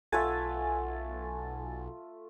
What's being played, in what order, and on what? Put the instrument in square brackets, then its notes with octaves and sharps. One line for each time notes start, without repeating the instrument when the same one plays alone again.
[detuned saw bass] B1 [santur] A3 F4 E5 [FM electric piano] F#5 G#5 A6